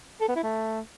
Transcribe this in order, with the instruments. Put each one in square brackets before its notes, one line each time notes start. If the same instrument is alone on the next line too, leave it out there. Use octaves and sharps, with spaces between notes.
[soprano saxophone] A4
B3
E4
A3